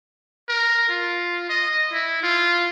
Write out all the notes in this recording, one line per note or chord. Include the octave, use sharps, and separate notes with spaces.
A#4
F4
D#5
E4
F4